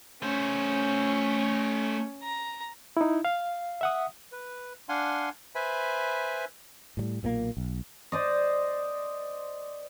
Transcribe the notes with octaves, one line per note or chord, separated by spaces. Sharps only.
A3 C#4 C5
A#5
D#4 E4
F5
E5 F#5 D#6
B4
D4 F5 F#5 G#5 C6
B4 C5 E5 G#5 B5
A2 F#3 G3
B1 A#2 F3 A#3
B1
C5 D5 D#5